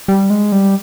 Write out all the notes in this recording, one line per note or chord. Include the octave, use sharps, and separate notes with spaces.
G3
G#3
G3